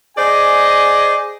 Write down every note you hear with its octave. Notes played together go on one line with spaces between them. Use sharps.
G#4 C5 D5 D#5 G#5